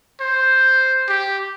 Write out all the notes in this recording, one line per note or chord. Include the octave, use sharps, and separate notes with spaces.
C5
G4